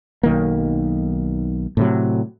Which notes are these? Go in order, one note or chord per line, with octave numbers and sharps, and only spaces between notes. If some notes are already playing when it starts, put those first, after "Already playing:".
B1 D#3 A#3
A2 C3 F#3